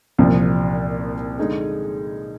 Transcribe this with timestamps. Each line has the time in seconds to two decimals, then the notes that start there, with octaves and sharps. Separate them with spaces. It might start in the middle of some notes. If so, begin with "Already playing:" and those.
0.18 C2 A#2 F3
1.38 D3 G#3 D#4 G#4